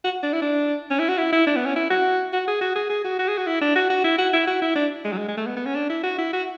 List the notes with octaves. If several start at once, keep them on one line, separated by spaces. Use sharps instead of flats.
F#4
D4
E4
D4
C#4
E4
F#4
E4
E4
D4
B3
C#4
E4
F#4
F#4
G#4
F#4
G#4
G#4
F#4
F#4
G#4
F#4
E4
D4
F#4
F#4
E4
F#4
E4
F#4
E4
D4
G#3
F#3
G#3
G#3
A3
B3
B3
C#4
D4
E4
F#4
E4
F#4